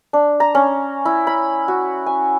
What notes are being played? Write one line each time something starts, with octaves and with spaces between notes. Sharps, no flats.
D4
A#5
C#4
E4
B5
F#4
G#5